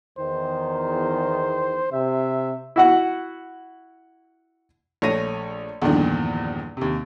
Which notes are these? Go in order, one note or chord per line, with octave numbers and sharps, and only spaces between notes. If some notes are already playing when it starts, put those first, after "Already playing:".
E2 D#3 C5
C3 E5
E4 F#4 F#5
A#1 A3 C#5 A#6 D#7
E2 G2 A#2 D3 D#3 F3
D#2 C3